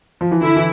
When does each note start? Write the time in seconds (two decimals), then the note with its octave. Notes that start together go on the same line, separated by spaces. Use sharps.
0.21 F3
0.32 E3
0.41 D3 E4
0.56 E3